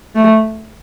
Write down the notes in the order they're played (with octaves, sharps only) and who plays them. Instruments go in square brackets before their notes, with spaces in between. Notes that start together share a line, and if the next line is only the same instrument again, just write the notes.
[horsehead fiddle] A3